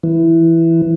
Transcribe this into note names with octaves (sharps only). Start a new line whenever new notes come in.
E3